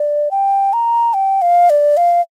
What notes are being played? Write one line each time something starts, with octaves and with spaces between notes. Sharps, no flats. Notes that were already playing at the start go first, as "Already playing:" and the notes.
Already playing: D5
G5
A#5
G5
F5
D5
F5